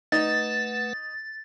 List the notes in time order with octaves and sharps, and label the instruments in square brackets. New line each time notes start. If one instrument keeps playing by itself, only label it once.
[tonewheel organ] A3 B4 F#5 [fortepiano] D#4 [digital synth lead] A6